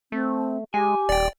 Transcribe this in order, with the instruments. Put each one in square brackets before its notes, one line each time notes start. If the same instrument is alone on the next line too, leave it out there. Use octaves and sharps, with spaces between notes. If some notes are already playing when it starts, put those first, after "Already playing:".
[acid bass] A3 [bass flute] C4
[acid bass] G#3 [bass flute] G4 [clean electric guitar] G#5
[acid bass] D#1 [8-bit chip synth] D5 G5